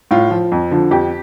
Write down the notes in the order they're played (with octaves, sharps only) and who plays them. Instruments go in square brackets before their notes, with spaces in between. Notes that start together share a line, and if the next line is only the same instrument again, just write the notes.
[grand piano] A2 F4
F3
F2
D3 F3
F2 G4